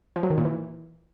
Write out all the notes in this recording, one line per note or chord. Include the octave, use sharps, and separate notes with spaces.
F3
F#3
D#3
A#2
E3